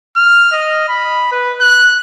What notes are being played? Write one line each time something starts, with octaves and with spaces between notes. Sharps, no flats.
F6
D#5
B5
B4
F#6